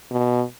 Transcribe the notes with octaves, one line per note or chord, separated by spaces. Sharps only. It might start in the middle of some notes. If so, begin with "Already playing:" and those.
B2